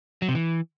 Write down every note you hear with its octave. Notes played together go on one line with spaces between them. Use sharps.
F#3
C3
E3